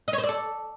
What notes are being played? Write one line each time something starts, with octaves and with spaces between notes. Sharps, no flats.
D#5
C#5
C5
D5
A4